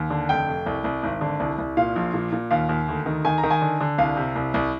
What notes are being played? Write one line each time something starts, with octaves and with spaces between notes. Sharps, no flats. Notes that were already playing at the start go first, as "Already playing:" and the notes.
Already playing: D#2
D3
F1 G5
F1
C2
C2
G#1
D3
C2
C2
A#2 F5
A#1
A#2
A#2
D#2 F5
D#2
D2
D#3
D#3 G#5
A#5
D#3
G#5
D3
D3
C2 F5
C3
C2
C2